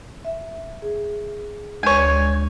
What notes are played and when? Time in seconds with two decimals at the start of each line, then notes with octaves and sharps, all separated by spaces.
0.25 E5
0.82 G#4
1.83 D2 G#3 C#5 G#5 G6